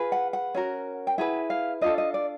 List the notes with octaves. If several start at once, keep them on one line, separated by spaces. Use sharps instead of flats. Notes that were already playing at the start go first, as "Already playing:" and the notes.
Already playing: F4 G#4 B4
F#5
F#5
C#4 F#4 A#4
G5
E4 G#4 B4 F#5
F5
D4 F4 A4 D#5
D#5
D5